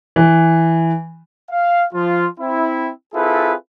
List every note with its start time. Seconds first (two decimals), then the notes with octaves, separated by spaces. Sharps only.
0.16 E3
1.50 F5
1.93 F3 F4
2.39 C4 E4
3.14 C4 E4 F4 G#4 A4 B4